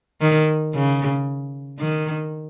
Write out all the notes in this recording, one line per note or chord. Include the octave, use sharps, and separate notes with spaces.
D#3
C#3
D#3